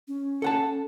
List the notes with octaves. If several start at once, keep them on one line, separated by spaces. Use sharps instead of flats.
C#4
A4 F#5 A5